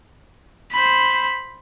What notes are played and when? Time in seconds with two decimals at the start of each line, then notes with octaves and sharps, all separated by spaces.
0.72 C5 B5